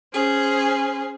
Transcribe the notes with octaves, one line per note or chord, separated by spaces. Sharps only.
C#4 G#4 C5